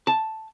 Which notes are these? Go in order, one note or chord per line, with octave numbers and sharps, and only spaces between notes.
A5